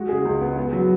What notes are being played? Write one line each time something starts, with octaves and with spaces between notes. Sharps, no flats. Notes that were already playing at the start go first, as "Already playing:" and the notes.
Already playing: G#3 F#4
C#3 G#4
C#2
B3
B3
F#3